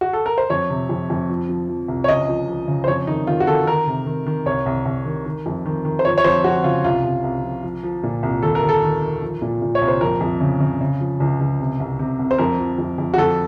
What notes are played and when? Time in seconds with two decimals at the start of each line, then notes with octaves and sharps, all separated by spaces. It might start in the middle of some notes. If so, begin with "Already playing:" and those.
0.01 F#4
0.13 A4
0.26 A#4
0.38 C5
0.50 F2 C#5
0.70 C3
0.89 F2
1.10 F2
1.29 F3
1.49 F3
1.69 F3
1.88 C2
2.04 C#5
2.08 C#2 D#5
2.29 F3
2.48 F3
2.68 C#3
2.84 C5
2.88 F2 C#5
3.07 D#3 D#4
3.27 D#3 F4
3.40 F#4
3.47 D#3 A4
3.67 D#3 A#4
3.87 C3
4.06 D#3
4.26 D#3
4.46 C2 C#5
4.66 C2
4.86 C2
5.05 D#3
5.25 D#3
5.46 F2
5.65 D#3
5.85 D#3
5.99 C5
6.05 F3 C#5
6.18 C#5
6.24 F2 C5
6.44 F2 F#4
6.64 C#3 F4
6.84 C2 F4
7.04 C2
7.24 C2
7.44 F3
7.63 F3
7.83 F3
8.03 A#2
8.23 C2
8.43 D#2 A4
8.55 A#4
8.63 D#2
8.69 A4
8.83 D#3
9.02 D#3
9.22 F3
9.42 A#2
9.62 A#2
9.75 C#5
9.81 C2
9.88 C5
10.01 F2 A#4
10.21 F2
10.41 C#3
10.60 C#3
10.81 C#3
11.00 F3
11.20 C#2
11.40 C#2
11.60 C3
11.80 C2
11.99 C3
12.19 C2
12.31 C5
12.38 F2 A#4
12.59 F3
12.78 F2
12.98 F2
13.14 F#4
13.18 F2 A4